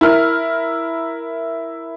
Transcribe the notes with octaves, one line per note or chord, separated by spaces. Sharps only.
E4 A#4 F6